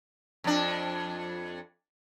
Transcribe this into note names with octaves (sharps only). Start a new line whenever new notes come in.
F2 D4